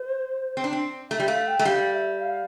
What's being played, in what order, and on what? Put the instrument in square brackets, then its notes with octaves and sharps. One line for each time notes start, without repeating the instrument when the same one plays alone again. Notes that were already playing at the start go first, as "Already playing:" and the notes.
Already playing: [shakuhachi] C5
[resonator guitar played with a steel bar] C4
D4
C4
[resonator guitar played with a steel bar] A3 [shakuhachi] E5
[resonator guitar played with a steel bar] G3
[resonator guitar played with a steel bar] A3 [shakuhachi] F5
[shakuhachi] G5
[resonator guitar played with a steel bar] A3
[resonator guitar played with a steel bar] G3 [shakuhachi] F5
[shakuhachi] E5
F5